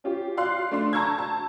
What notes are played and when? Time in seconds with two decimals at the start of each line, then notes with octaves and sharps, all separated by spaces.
0.04 C#4 F4 G4
0.37 D5 F5 C6 F#6
0.71 A3 D4 C6
0.93 A5 A#5 C#6 E6 G6 G#6
1.18 A5